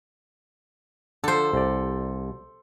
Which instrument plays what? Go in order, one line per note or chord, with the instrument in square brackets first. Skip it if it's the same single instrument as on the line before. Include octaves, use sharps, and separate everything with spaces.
[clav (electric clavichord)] D3 F3 [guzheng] A4 C5
[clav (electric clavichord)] C2 D5